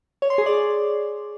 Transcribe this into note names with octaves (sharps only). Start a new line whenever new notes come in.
C#5
C6
G#4
D5